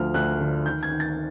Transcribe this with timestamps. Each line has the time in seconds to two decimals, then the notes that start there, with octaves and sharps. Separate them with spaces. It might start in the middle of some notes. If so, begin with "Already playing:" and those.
Already playing: D2 F3 F6
0.14 D2 F#6
0.41 D3
0.66 D#3 G6
0.83 G#6
0.91 D#3
1.00 A6